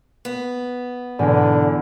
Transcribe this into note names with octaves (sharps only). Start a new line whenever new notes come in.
B3
E2 G#2 B2 D3 G#5